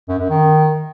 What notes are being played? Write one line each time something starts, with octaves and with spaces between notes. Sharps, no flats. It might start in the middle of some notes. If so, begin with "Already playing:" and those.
F#2
F#2
D#3